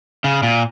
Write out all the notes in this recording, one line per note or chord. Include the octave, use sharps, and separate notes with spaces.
C#3
A#2